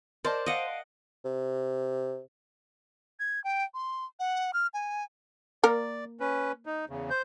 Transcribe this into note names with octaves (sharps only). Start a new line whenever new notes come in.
A#4 C5 D5 D#5 A5
D#5 F5 F#5 D7 D#7
C3
G#6
G5
C6
F#5
F6
G#5
A#3 A#4 D5
C#4 B4
D#4
E2 C#3
C5 G6